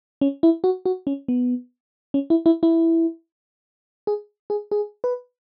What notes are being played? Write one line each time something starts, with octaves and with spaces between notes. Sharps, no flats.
C#4
E4
F#4
F#4
C#4
B3
C#4
E4
E4
E4
G#4
G#4
G#4
B4